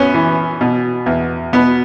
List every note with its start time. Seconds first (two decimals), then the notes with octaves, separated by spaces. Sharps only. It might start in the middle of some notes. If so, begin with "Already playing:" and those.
Already playing: F#2 B3 C#4
0.14 E3
0.61 B2
1.06 E2
1.53 B2 B3